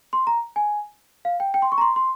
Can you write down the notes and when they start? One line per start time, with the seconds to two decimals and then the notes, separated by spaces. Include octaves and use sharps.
0.13 C6
0.27 A#5
0.56 G#5
1.25 F5
1.40 G5
1.54 G5
1.62 C6
1.72 C#6
1.78 A#5
1.81 C6
1.96 C6